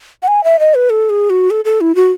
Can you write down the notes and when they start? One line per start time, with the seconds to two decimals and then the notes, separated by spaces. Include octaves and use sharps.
0.23 F#5
0.28 G#5
0.44 E5
0.59 D#5
0.75 B4
0.90 A4
1.10 G#4
1.30 F#4
1.50 A4
1.65 A4
1.81 E4
1.95 F#4